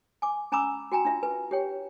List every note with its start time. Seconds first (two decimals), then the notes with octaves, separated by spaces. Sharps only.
0.22 G#5 D6
0.52 C#4 G#5 A#5 B5 D6 E6
0.92 F#4 G5 G#5 A#5
1.05 D4 F4 E5
1.23 B4 G#5
1.51 G4 C#5 G5